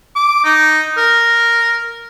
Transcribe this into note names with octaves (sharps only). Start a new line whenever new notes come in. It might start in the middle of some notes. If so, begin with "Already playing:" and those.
D6
D#4
A#4